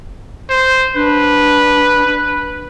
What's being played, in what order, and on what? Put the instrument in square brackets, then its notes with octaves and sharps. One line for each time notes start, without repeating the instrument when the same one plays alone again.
[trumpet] C5
[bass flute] D4 [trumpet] B4